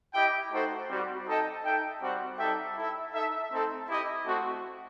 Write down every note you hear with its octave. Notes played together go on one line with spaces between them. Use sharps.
E4 G4 D#5 G5
A3 D#4 F#4 A4 C5
G3 C4 F#4
D#4 A4 D#5 G5
D#4 A4 E5 G5
G3 C4 F#4 C5 F#5
G3 D#4 A4 E5 G5
E4 A4 E5
D#4 A4 E5
A3 C4 D#4 A4
E4 G4 D#5
A3 C4 F#4